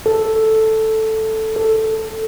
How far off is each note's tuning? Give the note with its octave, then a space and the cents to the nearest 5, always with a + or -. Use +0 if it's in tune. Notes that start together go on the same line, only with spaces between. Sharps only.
A4 +0
A4 +5